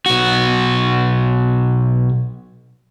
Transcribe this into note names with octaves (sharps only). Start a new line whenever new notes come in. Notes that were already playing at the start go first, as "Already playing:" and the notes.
B1 F#4